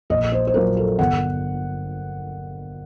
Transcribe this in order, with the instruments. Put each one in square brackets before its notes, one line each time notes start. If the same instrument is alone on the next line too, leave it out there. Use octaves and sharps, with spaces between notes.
[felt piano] A#1 D#5
C5
C5
A#2 F#3 A#3 A#4
A4
G1 F#5